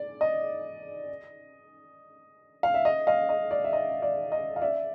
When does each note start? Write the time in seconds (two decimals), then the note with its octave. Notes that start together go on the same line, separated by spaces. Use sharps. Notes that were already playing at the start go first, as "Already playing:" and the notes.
Already playing: D5
0.21 D#5
2.63 F5
2.74 E5
2.85 D#5
3.07 D#5 F5
3.29 D#5
3.51 D5
3.64 E5
3.73 D#5
4.02 D5
4.32 D#5
4.56 F5
4.62 D5 E5